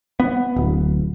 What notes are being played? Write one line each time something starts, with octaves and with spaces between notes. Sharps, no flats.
B3
D1